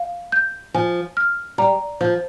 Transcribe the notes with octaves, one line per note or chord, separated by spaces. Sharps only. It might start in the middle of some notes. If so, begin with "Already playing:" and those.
Already playing: F5
G6
F3 G#5
F6
G3 A#5
F3 C5